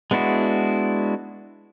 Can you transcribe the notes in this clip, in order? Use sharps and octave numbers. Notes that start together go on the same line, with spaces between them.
G#3 B3 D4 E4 F#4